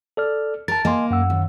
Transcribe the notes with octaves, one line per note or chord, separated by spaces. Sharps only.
A4 D5 F6
A#4 A5 A6
A#3 D#5 G#5 C6
F#2 F#5 E6
D#2